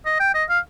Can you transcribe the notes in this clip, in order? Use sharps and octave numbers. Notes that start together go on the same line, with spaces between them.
D#5
G5
D#5
F5